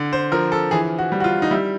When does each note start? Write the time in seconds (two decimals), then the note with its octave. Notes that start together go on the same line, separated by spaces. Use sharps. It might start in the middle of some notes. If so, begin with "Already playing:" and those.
Already playing: D3
0.13 C5
0.32 F3 A#4
0.52 A4
0.71 E3 G#4
0.98 F#4
1.12 G3
1.20 F#4
1.24 F4
1.42 D#4
1.51 G3 E4